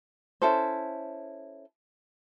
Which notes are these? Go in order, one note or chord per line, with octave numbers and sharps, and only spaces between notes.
C#4 E4 A4 C5